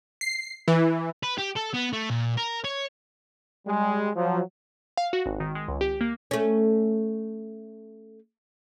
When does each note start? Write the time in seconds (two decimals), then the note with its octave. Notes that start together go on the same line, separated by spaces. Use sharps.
0.21 C7
0.68 E3
1.23 B4
1.38 G4
1.56 A4
1.74 B3
1.93 A3
2.10 A#2
2.37 A#4
2.64 C#5
3.67 G3 G#3
4.16 F3 F#3
4.97 F5
5.13 F#4
5.26 G#1
5.40 D#3
5.55 G#3
5.68 C#2
5.81 G4
6.01 A#3
6.31 A3 C#4